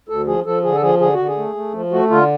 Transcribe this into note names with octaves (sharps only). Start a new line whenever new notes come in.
D2 A4
F3 G#4
F3 A4
D3 G#4
A4
F3 G#4
D3 G#4
F#4
D3
G#4
A3
A3
F3
A3 F#4
D3 F4